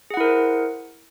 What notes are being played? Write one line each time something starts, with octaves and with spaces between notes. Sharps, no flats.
E4 G#4 A#4 C5 F#5